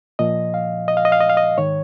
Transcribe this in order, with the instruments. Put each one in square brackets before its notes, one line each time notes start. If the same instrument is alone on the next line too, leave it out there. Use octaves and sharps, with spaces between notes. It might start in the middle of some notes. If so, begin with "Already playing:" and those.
[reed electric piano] A#2 F3 D#5
F5
D#5
F5
D#5
F5
D#5
F5
D#5
G#2 D#3 C#5